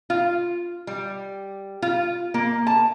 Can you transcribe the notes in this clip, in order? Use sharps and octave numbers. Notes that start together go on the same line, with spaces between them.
F4
G3
F4
A#3
A5